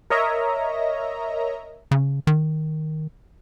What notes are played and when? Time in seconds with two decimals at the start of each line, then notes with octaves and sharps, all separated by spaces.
0.10 A#4 C#5 D#5 E5 A#5
1.91 C#3
2.27 D#3